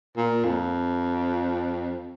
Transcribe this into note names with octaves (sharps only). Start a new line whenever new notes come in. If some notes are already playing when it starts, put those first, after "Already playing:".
A#2
F2